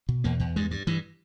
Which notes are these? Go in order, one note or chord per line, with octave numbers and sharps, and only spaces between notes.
B2
E2 A#3
E2
G2 G#3
G2
G2 E3